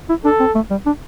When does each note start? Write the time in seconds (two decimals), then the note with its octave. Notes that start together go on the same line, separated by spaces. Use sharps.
0.09 E4
0.25 D4 A4
0.40 C4
0.55 A3
0.71 G3
0.86 D4